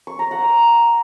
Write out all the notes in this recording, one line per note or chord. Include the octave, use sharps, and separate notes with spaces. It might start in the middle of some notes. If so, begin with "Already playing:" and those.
C#6
A#5
F#5